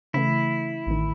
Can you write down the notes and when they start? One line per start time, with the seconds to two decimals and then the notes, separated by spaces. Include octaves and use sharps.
0.14 C#3 E3 A3 E4
0.87 A1 D#3